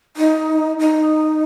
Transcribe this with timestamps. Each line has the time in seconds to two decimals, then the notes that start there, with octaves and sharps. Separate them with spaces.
0.17 D#4
0.79 D#4